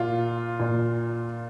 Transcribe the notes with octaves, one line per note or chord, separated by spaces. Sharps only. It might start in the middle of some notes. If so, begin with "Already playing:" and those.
Already playing: A#2 F4
A#2